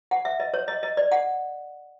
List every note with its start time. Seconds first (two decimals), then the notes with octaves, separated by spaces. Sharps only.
0.11 F#5
0.25 E5
0.40 D#5
0.54 C#5
0.68 D#5
0.83 D#5
0.97 D5
1.12 F#5